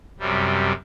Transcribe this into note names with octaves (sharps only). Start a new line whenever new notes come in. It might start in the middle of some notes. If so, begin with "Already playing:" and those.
F#2 C3 G3